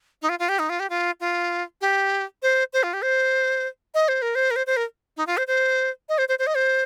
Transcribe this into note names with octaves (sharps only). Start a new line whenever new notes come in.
D#4
F4
F4
G4
D#4
F4
G4
F4
F4
G4
C5
C5
F4
G4
C5
D#5
C5
A#4
C5
A#4
C5
C5
A#4
D#4
F4
C5
C5
D#5
C5
C5
C5
D#5
C5